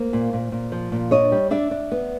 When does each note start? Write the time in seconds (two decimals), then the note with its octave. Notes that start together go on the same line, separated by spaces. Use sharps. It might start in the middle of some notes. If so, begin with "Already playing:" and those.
Already playing: A#3 C5
0.13 A#2
0.33 A#2
0.52 A#2
0.72 F3
0.92 A#2
1.11 D4 C#5 D#5
1.32 G3
1.51 D4 D5 E5
1.71 D4
1.92 B3